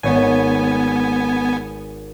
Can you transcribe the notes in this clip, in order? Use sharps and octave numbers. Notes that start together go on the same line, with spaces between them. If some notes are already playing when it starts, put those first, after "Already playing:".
G#1 B3 C#5 G#5